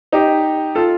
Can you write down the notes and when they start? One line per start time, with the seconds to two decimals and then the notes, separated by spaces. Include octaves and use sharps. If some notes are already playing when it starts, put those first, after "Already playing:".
0.12 D#4 G4
0.75 F4 A4